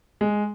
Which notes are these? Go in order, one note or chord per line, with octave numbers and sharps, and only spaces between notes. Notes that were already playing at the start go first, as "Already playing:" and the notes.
G#3